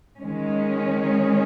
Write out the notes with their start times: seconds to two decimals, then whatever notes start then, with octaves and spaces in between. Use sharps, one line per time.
0.18 D#3 G#3 C#4